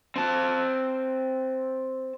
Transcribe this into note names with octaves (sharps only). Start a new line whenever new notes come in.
C4 A5